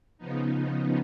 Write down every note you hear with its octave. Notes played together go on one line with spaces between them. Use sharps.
C#3 F3 B3 D#4